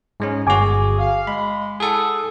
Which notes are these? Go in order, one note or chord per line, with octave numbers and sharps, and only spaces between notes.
G#2 G#3 C#4
G1 F#4 G#4 G#5 D6
F5
G#3 B5
E4 G#4 A4 F#5